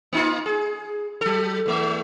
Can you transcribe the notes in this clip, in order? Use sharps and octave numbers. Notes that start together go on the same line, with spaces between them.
A#3 D#4 F4
G#4
F#3 A4
E2 A3 E5